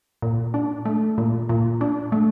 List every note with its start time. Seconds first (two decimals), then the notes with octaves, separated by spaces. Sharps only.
0.22 A#2
0.54 D4
0.85 A3
1.18 A#2
1.49 A#2
1.81 D4
2.12 A3